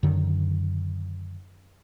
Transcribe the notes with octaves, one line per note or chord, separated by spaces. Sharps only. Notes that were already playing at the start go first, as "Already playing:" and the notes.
F#2 D3 D#3